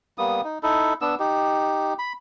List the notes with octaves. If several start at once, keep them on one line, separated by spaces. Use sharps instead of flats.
G3 A#3 B3 D#6
D#4
D#4 E4 A4
B3 D4 E6
D#4 G4
B5